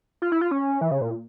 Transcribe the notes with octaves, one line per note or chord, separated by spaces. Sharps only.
F4
E4
F4
C#4
E3
C#3
A#2